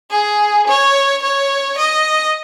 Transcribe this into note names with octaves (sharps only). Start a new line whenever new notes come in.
G#4
C#5
C#5
D#5